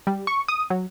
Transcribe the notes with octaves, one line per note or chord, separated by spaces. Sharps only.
G3
C#6
D#6
F#3